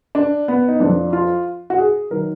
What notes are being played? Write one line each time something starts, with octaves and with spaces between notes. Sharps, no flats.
D4
B3
D#4
F2 F3 D4
F4
F#4
G#4
D#3 F#3 A#4